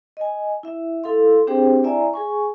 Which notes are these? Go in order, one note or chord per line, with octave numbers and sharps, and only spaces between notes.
D#5 G#5
E4 E5
E4 A4 F5 C6
C4 D4 G4 G#4 C5 G5
E4 D5 E5 G#5 A#5
G#4 G#5 C#6